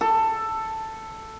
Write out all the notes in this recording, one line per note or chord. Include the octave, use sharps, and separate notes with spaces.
A4